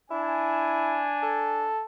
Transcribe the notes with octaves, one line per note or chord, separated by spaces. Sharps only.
D4 E4 G#5
A4